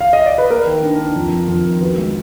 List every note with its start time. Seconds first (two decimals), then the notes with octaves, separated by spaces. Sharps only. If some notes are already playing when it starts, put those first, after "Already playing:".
0.00 F5
0.13 D#5
0.26 D5
0.38 B4
0.50 A#3 A#4
0.66 D#3
0.83 D4
0.99 D4
1.16 F2
1.32 F2
1.48 F2
1.66 D#3
1.81 B3 F#4
1.98 G#3